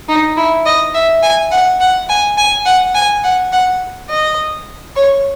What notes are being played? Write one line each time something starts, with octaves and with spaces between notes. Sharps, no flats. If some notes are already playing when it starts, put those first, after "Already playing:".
D#4
E4
D#5
E5
G#5
F#5
F#5
G#5
G#5
F#5
G#5
F#5
F#5
D#5
C#5